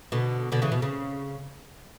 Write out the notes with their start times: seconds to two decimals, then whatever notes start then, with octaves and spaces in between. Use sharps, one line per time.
0.12 B2 D3
0.52 B2 D3
0.62 C#3 E3
0.72 B2
0.82 C#3